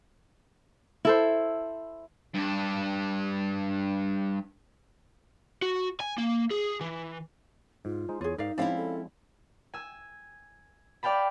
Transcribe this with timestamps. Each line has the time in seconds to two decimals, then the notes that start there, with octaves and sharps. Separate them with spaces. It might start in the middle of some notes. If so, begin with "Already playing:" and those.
1.05 E4 A4 C5
2.35 G2 D4
5.62 F#4
6.00 G#5
6.18 A#3
6.51 G#4
6.81 E3
7.85 G#2 F4
8.09 G#3 D#4 C5
8.21 E2 F4 G#4 C#5
8.38 G#2 D#4 A#4 D5 F5
8.58 F3 G#3 C4 C#4 E4 D5 F5
8.77 A4
9.74 G#5 E6
11.03 D5 F5 G5 A5 B5